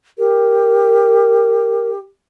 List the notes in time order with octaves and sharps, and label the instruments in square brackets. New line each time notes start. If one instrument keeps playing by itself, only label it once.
[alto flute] G4 [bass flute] A#4